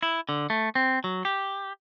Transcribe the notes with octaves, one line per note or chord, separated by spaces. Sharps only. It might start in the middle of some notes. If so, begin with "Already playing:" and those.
E4
D3
A3
C4
F#3
G4